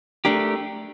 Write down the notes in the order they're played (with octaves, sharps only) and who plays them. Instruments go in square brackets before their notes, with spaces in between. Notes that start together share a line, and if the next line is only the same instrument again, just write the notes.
[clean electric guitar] A3 D4 G4 A#4